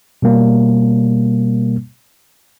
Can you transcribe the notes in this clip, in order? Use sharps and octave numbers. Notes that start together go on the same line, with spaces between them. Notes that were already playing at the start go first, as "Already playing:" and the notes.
B2 G3 A#3